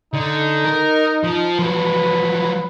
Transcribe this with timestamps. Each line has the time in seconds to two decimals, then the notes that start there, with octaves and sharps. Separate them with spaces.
0.14 D3 D#4
0.65 A#4
1.24 F3
1.59 F3 F#3 B4